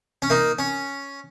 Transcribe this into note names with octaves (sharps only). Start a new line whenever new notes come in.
C#4
A#3 D#4
C#4